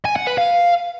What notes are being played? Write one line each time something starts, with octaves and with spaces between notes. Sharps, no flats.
G#5
F#5
B4
F5